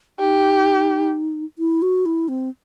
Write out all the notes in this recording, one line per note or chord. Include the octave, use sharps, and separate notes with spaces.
D#4 G4
E4
F#4
E4
C4